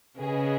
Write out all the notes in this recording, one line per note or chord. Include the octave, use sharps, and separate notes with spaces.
C#3 G#4 B4 D#5